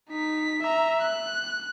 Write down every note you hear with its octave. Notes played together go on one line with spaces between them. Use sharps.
D#4 B6
E5 A#5
F#6